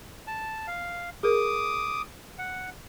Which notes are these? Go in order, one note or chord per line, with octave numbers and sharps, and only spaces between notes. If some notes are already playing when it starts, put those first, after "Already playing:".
A5
F5
G#4 A#4 D6 D#6
F#5